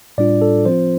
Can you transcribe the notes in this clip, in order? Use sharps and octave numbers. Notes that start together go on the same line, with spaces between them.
A2 G3 D4 F4 D5
A4
F3 C4 F4 C5